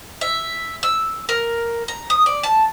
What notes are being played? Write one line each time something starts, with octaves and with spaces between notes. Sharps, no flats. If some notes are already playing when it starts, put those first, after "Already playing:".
E5
E6
A#4
A#5
D#6
D5
A5